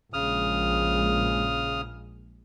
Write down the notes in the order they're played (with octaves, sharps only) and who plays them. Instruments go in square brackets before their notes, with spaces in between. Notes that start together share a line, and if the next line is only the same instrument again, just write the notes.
[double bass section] A#1 G#3 [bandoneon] C#3 D#6 F6